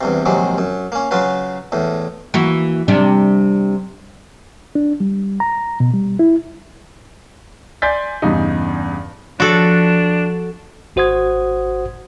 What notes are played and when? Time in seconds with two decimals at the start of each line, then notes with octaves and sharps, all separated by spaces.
0.01 E2 G2 C3
0.26 A#1 D#2 C3 F#3 G#3
0.58 F#2
0.92 A#3 C#4
1.11 C#3 F#3 F4 B4
1.72 E2 A2
2.34 E3 A#3 F#4
2.88 C3 G3 D4
4.75 D4
5.00 G3
5.40 A#5
5.80 B2
5.94 G3
6.19 E4
7.82 D5 G#5 C6 G6 A6 B6
8.22 E2 G2 C#3 G3 D#4
9.40 F3 D4 F#4 A4
10.96 G#1 F#4 C5 F#5 D#6 G#6